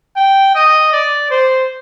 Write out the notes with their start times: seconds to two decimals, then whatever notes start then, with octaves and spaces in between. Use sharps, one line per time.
0.17 G5
0.55 D#5
0.93 D5
1.31 C5